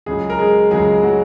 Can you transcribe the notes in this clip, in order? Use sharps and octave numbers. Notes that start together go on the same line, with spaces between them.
C#2 C#3 F#3 G#3 G#4
A#4
G#3 G#4
C#2 C#3 F#3 G#3 G#4
F#3 F#4